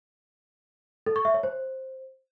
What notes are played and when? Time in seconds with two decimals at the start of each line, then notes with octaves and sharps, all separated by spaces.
1.06 A4
1.16 C#6
1.25 E5
1.34 C#5
1.43 C5